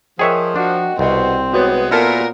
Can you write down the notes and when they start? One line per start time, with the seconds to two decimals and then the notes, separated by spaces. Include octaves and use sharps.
0.19 F3 G#4 A#4 C#5 D#5 E5 G5
0.56 D4 F#4
0.99 C2 B2 C4
1.53 G#3 B3 F#4 B4 C#5
1.91 A#2 B3 E4 A4 A#4 A5